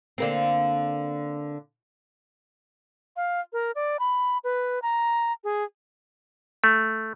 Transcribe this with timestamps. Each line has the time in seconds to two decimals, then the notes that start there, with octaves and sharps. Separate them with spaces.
0.18 D3 A#3 C4
3.17 F5
3.53 A#4
3.75 D5
4.00 B5
4.44 B4
4.82 A#5
5.44 G#4
6.64 A3